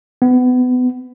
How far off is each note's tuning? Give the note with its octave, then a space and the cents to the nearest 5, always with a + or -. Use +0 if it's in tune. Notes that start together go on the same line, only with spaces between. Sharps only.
B3 +25